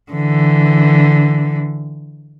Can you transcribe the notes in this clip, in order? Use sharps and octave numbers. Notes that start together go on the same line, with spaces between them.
D3 E3